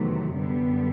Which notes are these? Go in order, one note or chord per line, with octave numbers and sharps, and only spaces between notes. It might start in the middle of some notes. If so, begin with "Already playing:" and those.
Already playing: E2 C3 D#3 F#3 A3
F#2 D3 G3 B3